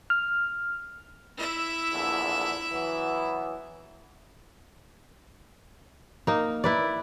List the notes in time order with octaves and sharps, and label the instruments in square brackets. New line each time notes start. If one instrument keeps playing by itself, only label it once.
[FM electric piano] F6
[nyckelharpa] E4 E5
[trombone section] A#1 E2 D3
E3 F#3 B3
[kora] A#3 D#4
E4 B4 D5